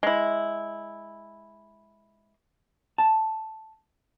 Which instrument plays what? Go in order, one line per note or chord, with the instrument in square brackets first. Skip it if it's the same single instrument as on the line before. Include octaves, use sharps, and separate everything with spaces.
[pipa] G#3 E4
[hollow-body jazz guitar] A5